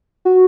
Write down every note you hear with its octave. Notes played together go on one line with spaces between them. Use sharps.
F#4